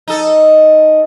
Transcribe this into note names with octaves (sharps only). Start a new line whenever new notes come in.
D#4 A4